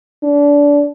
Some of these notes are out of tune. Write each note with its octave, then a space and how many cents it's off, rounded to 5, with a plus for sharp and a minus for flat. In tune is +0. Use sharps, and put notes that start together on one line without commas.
D4 -25